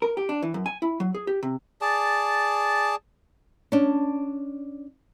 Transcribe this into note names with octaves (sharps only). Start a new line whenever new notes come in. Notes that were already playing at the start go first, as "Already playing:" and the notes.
A#4
G4
D4
E3
F#2
G#5
E4
F#3
G#4
G4
C3
G#4 D5 A5
C#4 D4